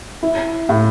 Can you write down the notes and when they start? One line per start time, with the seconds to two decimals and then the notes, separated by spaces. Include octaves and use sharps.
0.23 E4
0.69 A2